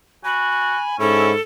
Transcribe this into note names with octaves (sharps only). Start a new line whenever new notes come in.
F#4 G#5 B5
G#2 C#4 E4 A4